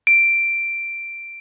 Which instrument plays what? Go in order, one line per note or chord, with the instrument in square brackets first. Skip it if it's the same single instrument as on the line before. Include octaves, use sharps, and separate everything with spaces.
[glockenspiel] D7